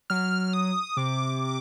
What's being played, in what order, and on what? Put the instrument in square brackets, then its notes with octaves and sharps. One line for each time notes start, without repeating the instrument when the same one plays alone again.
[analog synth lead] F#3 [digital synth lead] F6
[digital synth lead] D#6
[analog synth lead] C3 [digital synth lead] D6